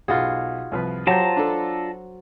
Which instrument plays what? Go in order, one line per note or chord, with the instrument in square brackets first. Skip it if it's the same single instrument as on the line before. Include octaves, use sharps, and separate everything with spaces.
[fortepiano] B1 [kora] F4 F#4 G#4
[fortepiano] C2 F3 B4
[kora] F#3 C5 [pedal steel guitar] F4 A5 A#5 [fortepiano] G4
[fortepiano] D4 A4